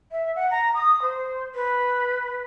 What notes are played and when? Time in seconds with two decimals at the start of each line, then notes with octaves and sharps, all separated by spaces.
0.12 E5
0.36 F#5
0.51 A#5
0.74 D#6
1.02 C5
1.55 B4